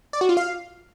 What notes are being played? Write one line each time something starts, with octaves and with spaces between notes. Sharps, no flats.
D5
F#4
F4
F5